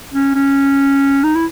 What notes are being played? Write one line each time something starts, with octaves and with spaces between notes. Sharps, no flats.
C#4
C#4
D#4
E4